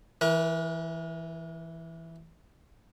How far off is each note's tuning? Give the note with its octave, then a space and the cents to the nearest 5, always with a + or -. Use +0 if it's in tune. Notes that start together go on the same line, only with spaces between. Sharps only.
E3 +0 A#4 +45